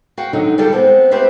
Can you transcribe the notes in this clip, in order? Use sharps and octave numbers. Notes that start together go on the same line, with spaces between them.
F#4 F5 G5
D3 D#3 F#3 D#4 C#5
G3 D4 E4 F4 G4 A4
G#3 B3 C4
A3 C4 G4 B4 C5 E5